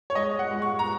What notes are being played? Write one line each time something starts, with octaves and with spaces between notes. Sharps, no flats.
C#5
G#3 D#5
F#5
G#3
C#6
A#5